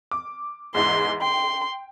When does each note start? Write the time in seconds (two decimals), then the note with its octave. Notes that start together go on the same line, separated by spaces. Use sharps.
0.11 D6
0.74 E2 G#2 E3 C6
1.22 G5 C6